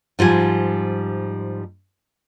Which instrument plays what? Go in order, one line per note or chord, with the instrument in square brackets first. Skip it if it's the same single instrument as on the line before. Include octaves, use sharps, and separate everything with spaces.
[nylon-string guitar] G#2 F3 G3 G#5